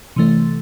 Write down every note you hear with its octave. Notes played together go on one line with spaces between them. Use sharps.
C3 E3 A3